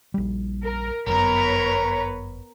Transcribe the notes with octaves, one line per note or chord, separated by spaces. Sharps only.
A#1 G3
A#4
G1 F#2 B3 A#4 B4 C#5 A#5